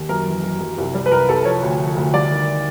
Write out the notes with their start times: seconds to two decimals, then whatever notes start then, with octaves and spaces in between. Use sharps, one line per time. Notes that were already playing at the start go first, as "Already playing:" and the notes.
Already playing: D#2
0.09 F#2 A#4
0.27 E3
0.44 F#2
0.61 F#2
0.78 C2
0.95 G3
1.06 B4
1.11 C2 A#4
1.29 C2 A4
1.45 F3 C#5
1.63 D2
1.80 F3
1.97 D2
2.14 G3 D5
2.31 D#3